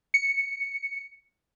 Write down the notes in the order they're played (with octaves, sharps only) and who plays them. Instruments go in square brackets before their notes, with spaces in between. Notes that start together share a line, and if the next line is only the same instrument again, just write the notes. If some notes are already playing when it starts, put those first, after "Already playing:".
[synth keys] C#7